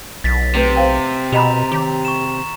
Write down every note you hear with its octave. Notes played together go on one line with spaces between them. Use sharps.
B1 A6 B6
C3 A3 B4
C5 F5 G5
B2 G4 D#5 A#5 B5 F7
D#3 G4
C#6 E7